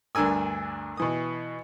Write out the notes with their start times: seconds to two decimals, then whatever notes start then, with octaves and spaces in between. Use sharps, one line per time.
0.15 D2 G2 D4 A#4 G#5 E6
0.97 B2 E3 D#6